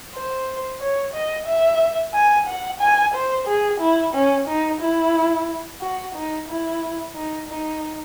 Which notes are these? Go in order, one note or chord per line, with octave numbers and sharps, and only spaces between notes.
C5
C#5
D#5
E5
G#5
F#5
G#5
C5
G#4
E4
C#4
D#4
E4
F#4
D#4
E4
D#4
D#4